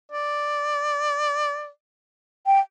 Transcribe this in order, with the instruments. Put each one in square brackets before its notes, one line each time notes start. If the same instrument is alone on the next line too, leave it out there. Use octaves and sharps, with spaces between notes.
[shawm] D5
[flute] G5